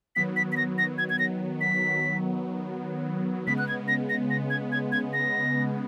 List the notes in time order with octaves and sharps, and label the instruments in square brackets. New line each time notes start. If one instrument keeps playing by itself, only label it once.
[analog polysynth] D#3 F#3 B3 [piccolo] B6
[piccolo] B6
B6
A#6
A#6
G#6
G#6
A#6
B6
[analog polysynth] C#3 G#3 B3 [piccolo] B6
[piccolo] F#6
G#6
A#6
A#6
A#6
G#6
G#6
G#6
A#6